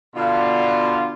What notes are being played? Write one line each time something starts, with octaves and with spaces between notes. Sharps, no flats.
B2 D3 D4 F4